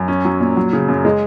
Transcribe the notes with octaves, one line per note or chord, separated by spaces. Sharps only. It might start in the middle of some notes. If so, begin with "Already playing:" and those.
Already playing: F#2
C#4
F#3
A#2
F#3
C#3
F#2
G#3